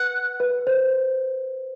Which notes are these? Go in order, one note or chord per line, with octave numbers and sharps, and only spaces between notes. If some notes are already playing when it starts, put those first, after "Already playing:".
Already playing: B4 F#5
B4
C5